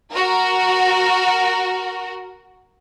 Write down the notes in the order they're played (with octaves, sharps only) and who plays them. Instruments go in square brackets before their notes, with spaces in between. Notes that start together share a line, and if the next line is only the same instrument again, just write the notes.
[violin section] F#4 A#4